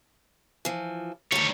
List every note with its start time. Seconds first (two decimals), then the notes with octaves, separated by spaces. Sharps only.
0.65 E3 F3
1.32 D2 D#3 G3 C#5